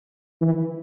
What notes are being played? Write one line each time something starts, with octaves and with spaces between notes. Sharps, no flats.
E3